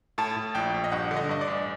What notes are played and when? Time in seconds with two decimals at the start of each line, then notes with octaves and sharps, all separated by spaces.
0.18 A2 A5
0.36 A2
0.55 A#1 G5
0.74 A#1
0.84 D#5
0.92 G2 F#5
1.11 D3
1.16 D#5
1.29 G2 D#5
1.41 D5
1.48 A1